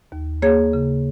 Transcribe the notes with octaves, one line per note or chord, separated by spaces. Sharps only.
D#2
A#3 G#4 C#5
C#3